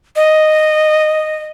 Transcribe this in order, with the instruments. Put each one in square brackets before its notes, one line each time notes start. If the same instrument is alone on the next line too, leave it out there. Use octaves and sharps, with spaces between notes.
[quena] D#5